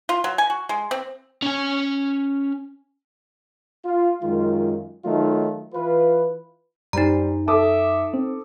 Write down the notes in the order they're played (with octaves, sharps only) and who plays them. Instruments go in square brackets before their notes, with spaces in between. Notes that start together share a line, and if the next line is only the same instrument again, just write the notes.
[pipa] F4
F#3
G#5
F#4
G#3
C4
[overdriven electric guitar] C#4 G#5
[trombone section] F4
F#2 D#3 G#3 F4
D#3 F#3 A3 D#4 F4
E3 F4 B4
[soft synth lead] F#2 [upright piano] G3 C5 [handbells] D#4 A#5
[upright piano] A4 D6 D#6 [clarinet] E5
[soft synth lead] C4